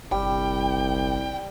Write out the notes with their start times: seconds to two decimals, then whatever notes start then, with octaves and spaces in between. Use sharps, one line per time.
0.12 G1 C2 G3 G5